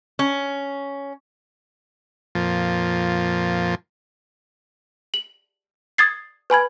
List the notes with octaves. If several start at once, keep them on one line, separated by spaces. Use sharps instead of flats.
C#4
F2 A#2 F3
F#7
D#6 G#6 A6 C7
B4 G#5 B5 G#6